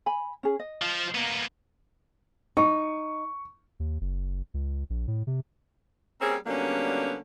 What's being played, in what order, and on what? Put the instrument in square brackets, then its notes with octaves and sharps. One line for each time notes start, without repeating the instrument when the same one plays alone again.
[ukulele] G#5 B5
C#4 G#4
D#5
[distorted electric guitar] F3
A#3 B3
[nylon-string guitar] D#4 [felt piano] C#6
[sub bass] D#2
F#1
C#2
A#1
A2
C3
[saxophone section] G3 A#3 C4 C#4 G#4
D3 F#3 G3 A#3 B3 C#4